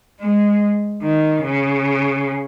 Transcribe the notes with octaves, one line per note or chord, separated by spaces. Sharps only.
G#3
D#3
C#3